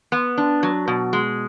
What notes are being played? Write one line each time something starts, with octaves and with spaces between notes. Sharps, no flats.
B3
D4
F#3
B2
G#3